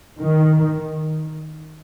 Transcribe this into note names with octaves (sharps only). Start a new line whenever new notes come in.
D#3